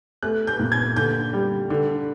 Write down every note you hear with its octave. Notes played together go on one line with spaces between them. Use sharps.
A3 F#6
G6
A#2
G#6
D3 G6
G3
D3